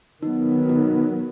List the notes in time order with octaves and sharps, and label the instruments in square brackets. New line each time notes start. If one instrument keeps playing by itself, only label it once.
[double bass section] D#3 F#3 B3 [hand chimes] D#4
[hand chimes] D#4